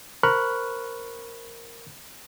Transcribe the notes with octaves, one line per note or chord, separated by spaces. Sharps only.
A#4 C5 B5 C#6 F6 F#6